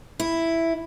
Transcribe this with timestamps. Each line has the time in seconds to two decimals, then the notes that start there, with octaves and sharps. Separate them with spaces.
0.20 E4